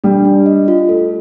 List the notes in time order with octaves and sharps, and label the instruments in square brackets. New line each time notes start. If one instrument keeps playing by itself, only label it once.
[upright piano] G3 [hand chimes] D4
[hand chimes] D4
D#5
F4
[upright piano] A3 [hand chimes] A4